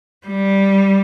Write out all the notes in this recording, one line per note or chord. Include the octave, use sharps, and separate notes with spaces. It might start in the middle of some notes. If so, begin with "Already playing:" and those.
G3